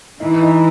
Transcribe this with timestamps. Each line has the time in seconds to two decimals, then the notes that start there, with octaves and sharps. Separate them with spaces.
0.20 E3 D#4
0.42 D#4